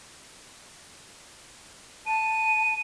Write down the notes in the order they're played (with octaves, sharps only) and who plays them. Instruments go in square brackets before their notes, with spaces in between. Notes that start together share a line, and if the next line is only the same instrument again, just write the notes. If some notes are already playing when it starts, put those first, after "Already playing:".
[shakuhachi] A5 [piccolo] D#7